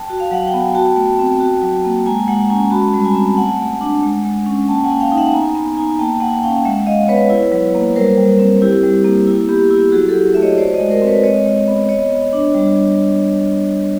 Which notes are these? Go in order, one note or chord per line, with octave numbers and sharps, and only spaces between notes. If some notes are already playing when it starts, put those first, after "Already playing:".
Already playing: G5 A5
F#4
F5
F#3 F#5
G5
B3
G#5
F#4 G5 A5
A3
C4
F#4
F#3
A#3
G#3 G#5 A#5
G#3 F#5 G#5
C#4 G#5 A#5
F#4 A5 B5
G3
G#5 A#5
C4
A5
A3 F#5 G#5
A3
D4
G#3
G#3
C#4
A#3 G5 A5
F#5 G#5
A#3
F5 G5
D#4
E5 F#5
B3 G#5 A#5
B3
D#4 G#5 A#5
A#3 G5 A5
A#3 F#5 G#5
C#4 F5 G5
G#3 E5 F#5
G#3 D#5 F5
B3 B4 C#5
E4
F#3
A#3
G3 A#4 C5
G3
C4
E4 G4
G3
A#3
E4
B3 G4
E4 G4
F#3 F#4 G#4
G4 A4
F#3
E5
A3
C#5 D#5
F#4 C5 D5
C#5 D#5
G#3
A#4 C5
C4
B4 C#5
G#3 C#5 D#5
G#3
B3
B3 C#5 D#5
B3
D4
G3